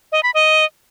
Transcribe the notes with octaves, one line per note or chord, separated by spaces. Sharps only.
D#5
B5
D#5